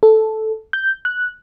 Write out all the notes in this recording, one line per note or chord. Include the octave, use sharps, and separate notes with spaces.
A4
G6
F#6